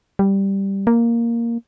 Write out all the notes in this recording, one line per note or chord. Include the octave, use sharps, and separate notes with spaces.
G3
A#3